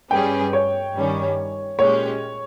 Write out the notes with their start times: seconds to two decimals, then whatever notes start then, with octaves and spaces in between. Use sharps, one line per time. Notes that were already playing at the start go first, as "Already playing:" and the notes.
0.11 G2 G3 C#4 G#4 B4 G5
0.53 C#5
0.95 G2 D#3 G3 C#4
1.78 A#2 G#3 C#4 G4 C#5